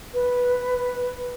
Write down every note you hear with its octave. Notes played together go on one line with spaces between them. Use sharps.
B4